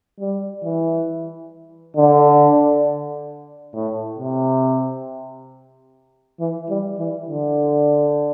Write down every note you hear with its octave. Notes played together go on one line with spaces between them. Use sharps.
G3
E3
D3
A2
C3
E3
G3
E3
D3